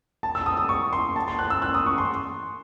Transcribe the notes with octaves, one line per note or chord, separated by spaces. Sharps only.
A5
E6
D#6
D#6
C#6
C6
A5
C6
F#6
E6
F#6
D#6
C#6
C6